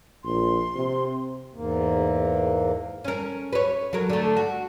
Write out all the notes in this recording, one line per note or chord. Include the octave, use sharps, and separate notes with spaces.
A#1 C6
C3
E2 G#2 A#3
C#4 A#4
B4 C#5
F#3 A#4
D3 A3
F#4